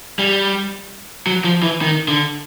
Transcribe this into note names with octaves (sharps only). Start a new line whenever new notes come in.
G3
F#3
F3
E3
D#3
D3